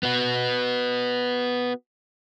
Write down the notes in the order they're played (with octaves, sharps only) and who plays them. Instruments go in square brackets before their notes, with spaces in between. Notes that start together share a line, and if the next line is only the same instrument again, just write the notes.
[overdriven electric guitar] B3 F#4